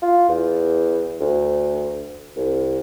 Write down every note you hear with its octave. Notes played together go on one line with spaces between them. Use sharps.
F4
E2
D2
C2